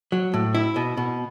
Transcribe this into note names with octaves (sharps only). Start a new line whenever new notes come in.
F#3
A2
E4
B2
B2